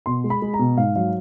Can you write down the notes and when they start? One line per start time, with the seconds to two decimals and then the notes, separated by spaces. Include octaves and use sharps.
0.06 B2 C6
0.24 G#3
0.30 B5
0.42 G#3
0.54 A#5
0.59 B2
0.77 G#2 F5
0.96 F#3 F5